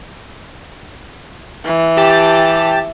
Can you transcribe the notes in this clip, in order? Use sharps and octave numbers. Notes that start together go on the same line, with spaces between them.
E3
G4 A5